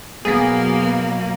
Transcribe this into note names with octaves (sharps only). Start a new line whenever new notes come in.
B2 F#3 A#3 B3 G#4